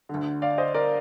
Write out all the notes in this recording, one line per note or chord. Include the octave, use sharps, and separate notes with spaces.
D3
D2
D5 F5
C5 D#5
A#4 D5